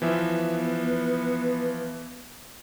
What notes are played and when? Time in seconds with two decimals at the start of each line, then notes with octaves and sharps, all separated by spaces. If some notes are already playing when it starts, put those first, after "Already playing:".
0.02 E3 F3 B3 E5